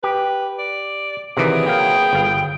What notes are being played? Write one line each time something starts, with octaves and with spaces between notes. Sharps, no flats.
G4 B4
D5
C3 D#3 E3 F#3 B3 G#4 D5
A#3 F5 G5
G1 F5